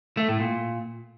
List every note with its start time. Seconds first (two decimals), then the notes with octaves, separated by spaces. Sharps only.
0.17 A3
0.28 A2
0.40 A#2